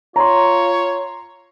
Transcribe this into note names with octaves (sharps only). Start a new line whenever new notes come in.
F4 C#5 A#5 C6